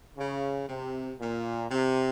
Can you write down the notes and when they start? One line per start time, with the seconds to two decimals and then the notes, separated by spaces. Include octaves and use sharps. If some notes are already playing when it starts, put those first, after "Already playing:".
0.17 C#3
0.68 C3
1.19 A#2
1.70 C3